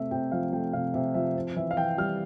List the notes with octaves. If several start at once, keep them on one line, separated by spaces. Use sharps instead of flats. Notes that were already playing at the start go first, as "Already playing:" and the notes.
Already playing: C3 A3 E5
C3 G5
F3 F5
A3 G5
C3 F5
C3 E5
F3 E5
C4
E3 E5
F5
E3 G5
G3 F6